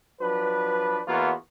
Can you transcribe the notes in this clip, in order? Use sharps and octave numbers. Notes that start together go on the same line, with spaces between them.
F3 F#3 D4 B4
E2 E3 A#3 B3 F4 F#4